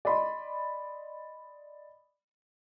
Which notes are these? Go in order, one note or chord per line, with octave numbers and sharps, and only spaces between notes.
D5 D#5 B5 C6